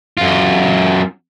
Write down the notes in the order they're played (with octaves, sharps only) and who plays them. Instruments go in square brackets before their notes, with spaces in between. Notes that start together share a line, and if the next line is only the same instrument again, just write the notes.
[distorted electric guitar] F#2 F4